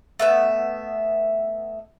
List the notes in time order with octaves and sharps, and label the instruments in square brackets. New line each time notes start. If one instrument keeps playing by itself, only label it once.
[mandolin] A3 B3 E5